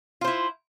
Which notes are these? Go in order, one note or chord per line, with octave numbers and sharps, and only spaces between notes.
E4 F4 C5